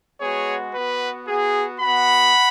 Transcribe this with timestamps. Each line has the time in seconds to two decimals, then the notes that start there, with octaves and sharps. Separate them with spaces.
0.21 G#3 B3 F#4 G#4 C#5
0.74 B3 F#4 B4
1.27 B3 F#4 G#4
1.80 B3 F#4 F#5 B5